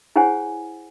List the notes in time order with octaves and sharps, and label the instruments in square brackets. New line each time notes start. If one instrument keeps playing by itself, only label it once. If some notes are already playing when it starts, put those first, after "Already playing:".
[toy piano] E4 G#4 C5 C#5 F#5 G#5